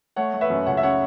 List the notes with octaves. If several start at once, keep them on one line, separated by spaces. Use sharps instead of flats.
A3 C#5 F#5
A3
B4 E5
F#2
C#2 C#5 F#5
E5
C#3 C#5 F#5